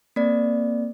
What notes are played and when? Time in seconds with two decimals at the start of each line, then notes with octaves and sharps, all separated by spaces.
0.16 A#3 C4 D5